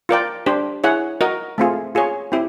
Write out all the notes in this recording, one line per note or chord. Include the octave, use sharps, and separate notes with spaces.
F4 A#4 D5 G5
D4 G4 C5
E4 G#4 C#5 F#5
F#4 A#4 D#5
A3 C4 F4 G#4
F4 G#4 C#5
C4 E4 G4